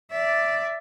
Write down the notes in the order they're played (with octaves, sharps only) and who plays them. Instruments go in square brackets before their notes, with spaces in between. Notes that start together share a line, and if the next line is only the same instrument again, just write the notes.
[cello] D5 E5